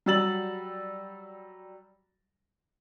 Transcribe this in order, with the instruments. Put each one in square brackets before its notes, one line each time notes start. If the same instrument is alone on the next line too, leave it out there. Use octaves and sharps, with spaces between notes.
[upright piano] F#3 G3 E6 A6 F#7